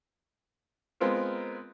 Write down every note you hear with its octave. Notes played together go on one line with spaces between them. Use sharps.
G#3 B3 C4 F4 A#4